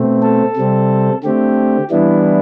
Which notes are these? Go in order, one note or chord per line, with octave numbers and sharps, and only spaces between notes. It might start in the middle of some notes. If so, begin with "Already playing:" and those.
Already playing: B2 A3 C4
A4
C3 G3 C4
D3 A3 C4 G4
E3 G3 B3 D4 E4